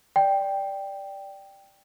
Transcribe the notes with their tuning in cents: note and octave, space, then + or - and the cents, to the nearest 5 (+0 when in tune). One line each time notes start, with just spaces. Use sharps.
D5 +0 G5 +0